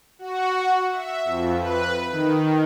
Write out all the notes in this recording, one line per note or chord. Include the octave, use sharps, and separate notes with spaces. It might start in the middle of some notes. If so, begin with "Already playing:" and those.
F#4
E5
F2
B4
D#3